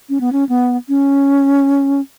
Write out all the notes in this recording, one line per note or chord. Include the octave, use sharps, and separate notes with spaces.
C#4
B3
C#4
B3
C#4